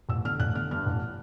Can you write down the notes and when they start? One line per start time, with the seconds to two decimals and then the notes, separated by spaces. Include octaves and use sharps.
0.09 A1 E6
0.25 D3 F6
0.39 A1 F#6
0.55 D3 F6
0.71 G2 F6
0.86 A1